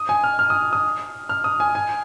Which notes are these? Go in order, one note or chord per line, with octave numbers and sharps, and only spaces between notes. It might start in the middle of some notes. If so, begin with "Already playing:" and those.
Already playing: D#6
G#5
F6
F6
D#6
D#6
F6
D#6
G#5
G#5